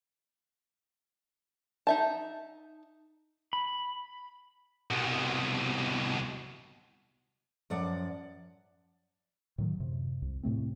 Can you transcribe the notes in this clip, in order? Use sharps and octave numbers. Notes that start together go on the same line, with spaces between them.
D#4 E5 A5
B5
C2 B2
F#2 F3 D5 F#5
A2 D#3 F#3
F#2 C3
C2
A2 C3 A3 C4